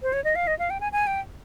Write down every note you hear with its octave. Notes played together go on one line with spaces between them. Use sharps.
C5
C#5
D#5
F5
D#5
F5
G5
G#5
G#5
G5